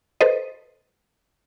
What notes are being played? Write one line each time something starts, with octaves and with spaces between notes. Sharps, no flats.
A4 B4 C5 D#5